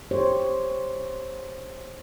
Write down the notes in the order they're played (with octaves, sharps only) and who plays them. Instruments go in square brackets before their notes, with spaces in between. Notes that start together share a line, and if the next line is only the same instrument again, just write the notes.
[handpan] G4 C5 C#5